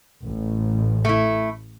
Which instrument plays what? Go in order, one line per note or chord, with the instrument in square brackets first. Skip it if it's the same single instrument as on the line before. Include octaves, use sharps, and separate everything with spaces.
[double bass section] A1
[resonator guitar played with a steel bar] A3 E4